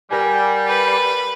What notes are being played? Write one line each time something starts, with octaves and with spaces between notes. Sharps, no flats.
G3 A#4 F#5 G#5
B4